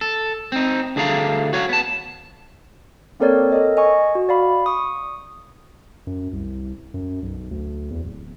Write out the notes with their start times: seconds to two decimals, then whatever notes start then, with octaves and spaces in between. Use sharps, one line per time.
0.01 A4
0.52 C4 D#4
0.96 D2 D4 G#4 A4 F5 A#5
1.53 F#4 C#5 F5
1.69 B3 A5
3.20 A#3 C4 A4 A#4 C#5 D5
3.52 A4 A#4 D#5
3.77 D#5 G#5 C#6
4.15 F#4
4.29 D5 F5 B5
4.66 C#6 D#6
6.07 F#2
6.33 C2
6.94 F#2
7.22 B1
7.51 D2
7.90 E2
8.04 D1